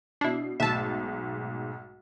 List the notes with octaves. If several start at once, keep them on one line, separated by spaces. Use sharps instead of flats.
B2 D4 E4 C7
B1 G#2 A3 E5 A5